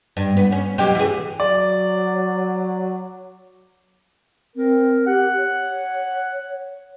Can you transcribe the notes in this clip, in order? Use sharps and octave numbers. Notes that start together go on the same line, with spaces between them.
G2
B3
C#4
B2 F#3 G4
E3 G#4
F#3 D5
C4 A#4
G4 F#5
C#5